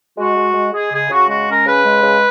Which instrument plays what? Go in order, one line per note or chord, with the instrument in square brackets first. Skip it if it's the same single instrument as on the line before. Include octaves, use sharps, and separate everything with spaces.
[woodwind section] G#3 F#4
G#3
G#3
G#3 G#4
C#3 G#4
C#3 F#4
G#3 F#4
C#4 A#4
C#3 B4
G#3
C#3